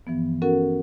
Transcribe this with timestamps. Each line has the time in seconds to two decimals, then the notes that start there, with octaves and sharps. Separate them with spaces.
0.07 G2 E3 F3 B3
0.42 C#4 F#4 A4 A#4 F#5